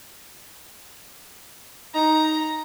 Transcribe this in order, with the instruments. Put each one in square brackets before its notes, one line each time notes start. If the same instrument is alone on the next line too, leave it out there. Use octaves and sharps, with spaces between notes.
[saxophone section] D#4 [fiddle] A#5